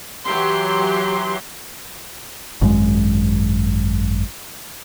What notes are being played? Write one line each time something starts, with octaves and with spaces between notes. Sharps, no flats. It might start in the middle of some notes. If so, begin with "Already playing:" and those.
E3 F#3 G4 C6
G#1 F#2 G#3